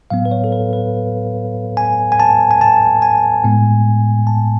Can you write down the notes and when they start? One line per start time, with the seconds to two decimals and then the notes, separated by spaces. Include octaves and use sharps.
0.10 A2 F#3 B3 F5
0.25 B4
0.31 C#5
0.44 A4
0.52 B4
0.73 B4
1.77 G#5
2.12 G#5
2.20 A5
2.51 G#5
2.61 A5
3.02 G#5
3.44 A2 G#3 B3
4.27 A5